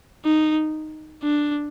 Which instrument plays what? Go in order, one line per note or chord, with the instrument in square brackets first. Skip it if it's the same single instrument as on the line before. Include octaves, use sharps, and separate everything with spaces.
[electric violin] D#4
D4